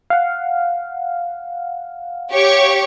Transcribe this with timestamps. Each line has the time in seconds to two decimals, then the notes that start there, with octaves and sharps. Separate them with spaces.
0.10 F5 F#5
2.31 G4 C#5 C#6